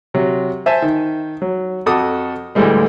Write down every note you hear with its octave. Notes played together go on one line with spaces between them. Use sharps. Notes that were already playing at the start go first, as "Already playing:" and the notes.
C3 F#3
C5 E5 G#5 A5
D#3
F#3
F2 F#4 A4 D6 D#6
D2 A2 D3 E3 G3 G#3